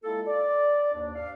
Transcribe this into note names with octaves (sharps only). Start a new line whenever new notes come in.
G#3 A#3 E4 F4 A4
D5
D#2 G#2 D4
D5 F5